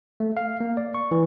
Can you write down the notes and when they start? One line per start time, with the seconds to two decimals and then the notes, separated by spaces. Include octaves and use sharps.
0.20 A3
0.37 F5
0.60 A#3
0.77 D5
0.94 C#6
1.11 E3